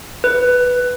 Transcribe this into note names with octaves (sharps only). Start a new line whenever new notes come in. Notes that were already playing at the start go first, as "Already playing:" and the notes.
B4